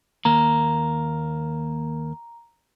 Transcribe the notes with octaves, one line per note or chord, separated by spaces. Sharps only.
D#2 A#3 A#5